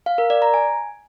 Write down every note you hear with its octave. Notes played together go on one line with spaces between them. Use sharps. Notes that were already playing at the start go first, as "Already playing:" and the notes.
F5
A#4
D5
A#5
G#5